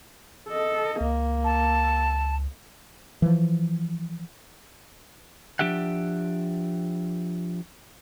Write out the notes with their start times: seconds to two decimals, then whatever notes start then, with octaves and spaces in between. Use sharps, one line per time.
0.48 A4 D#5
1.01 C#2 A#3
1.44 A5
3.22 E3 F3
5.59 F3 D4 G4 E5 F#5